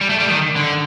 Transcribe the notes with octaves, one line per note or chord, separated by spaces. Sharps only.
G3
A3
G3
D#3
D3